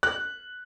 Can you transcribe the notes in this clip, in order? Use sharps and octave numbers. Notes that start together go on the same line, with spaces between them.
F#6